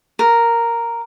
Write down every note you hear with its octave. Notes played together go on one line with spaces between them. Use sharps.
A#4